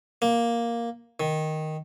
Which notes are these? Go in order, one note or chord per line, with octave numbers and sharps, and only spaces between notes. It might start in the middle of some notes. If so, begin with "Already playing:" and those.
A#3
D#3